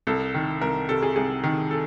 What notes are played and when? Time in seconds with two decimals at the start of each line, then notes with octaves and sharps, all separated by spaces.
0.07 C2 A4
0.34 D#3
0.62 C2 A#4
0.89 C3 A4
1.02 G#4
1.16 C2 G#4
1.44 D#3
1.71 A4